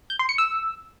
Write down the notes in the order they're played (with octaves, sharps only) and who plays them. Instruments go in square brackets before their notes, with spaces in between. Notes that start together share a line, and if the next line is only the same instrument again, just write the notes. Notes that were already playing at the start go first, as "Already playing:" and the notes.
[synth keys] G6
C6
C#7
E6